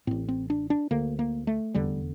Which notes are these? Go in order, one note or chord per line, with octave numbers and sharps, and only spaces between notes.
A1 A2 C4
C4
D4
D4
D2 D3 A#3
A#3
A3
F1 E2 D3 G3